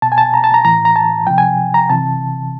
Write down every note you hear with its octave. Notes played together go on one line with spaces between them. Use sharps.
B2 A5
G#5
A5
A#5
A5
A#5
A2 E3 A#5
A#5
A5
C3 F3 G5
G#5
A#5
C3 E3 A5